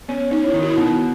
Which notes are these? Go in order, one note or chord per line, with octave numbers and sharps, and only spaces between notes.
B3 C#4
C#4 D#4
E4
D#3 D#4
F#4
E4
B2 D#4